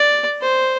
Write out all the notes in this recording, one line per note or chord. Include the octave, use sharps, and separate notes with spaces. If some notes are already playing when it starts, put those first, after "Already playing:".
Already playing: D5
C5